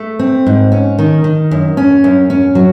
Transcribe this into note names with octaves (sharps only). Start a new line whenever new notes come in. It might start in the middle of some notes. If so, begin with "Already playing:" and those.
Already playing: A3
C4
G#2
C#4
D#3
D#3
F#2
C#4
F#2
C#4
F#3